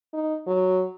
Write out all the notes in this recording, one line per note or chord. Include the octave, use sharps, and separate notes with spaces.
D#4
F#3